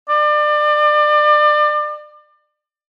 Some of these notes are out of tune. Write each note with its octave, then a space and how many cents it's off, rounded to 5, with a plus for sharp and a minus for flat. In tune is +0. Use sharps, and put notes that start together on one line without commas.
D5 +30